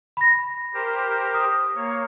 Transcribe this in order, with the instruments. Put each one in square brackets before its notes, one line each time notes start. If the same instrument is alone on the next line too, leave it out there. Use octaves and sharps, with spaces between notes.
[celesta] B5 A#6
[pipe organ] G4 A#4 C5
[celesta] D#6
[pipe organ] A#3 C#5